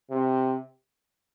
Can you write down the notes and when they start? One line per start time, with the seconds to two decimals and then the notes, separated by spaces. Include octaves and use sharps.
0.10 C3